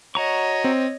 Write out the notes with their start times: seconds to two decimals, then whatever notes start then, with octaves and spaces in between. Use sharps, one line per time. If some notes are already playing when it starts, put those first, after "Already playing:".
0.15 F#4 C#5 D#5 A#5 C#6
0.64 C4